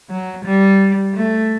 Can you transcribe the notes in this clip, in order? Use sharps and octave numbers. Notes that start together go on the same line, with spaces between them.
F#3
G3
A3